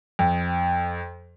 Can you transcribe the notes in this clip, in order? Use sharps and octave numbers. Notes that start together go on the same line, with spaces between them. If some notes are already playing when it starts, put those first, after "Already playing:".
F2